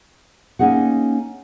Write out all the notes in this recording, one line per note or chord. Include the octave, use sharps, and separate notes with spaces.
A#3 C#4 D#4 G#4 F#5